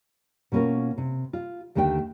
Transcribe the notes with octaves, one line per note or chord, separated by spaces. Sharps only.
B2 A#3 C#4 F4 A#4
C3
F4
D#2 D3 A3 A#4 G5